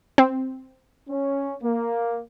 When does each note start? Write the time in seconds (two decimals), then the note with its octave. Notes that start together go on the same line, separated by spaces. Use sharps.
0.18 C4
1.09 C#4
1.62 A#3